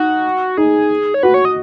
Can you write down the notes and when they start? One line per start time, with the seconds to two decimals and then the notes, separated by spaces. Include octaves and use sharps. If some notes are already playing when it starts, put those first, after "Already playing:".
Already playing: D#4 F#4
0.57 D#4 G#4
1.14 C#5
1.23 F#4 B4
1.34 C#5
1.45 D#5